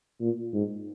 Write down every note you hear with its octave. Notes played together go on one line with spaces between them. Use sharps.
A#2
G#2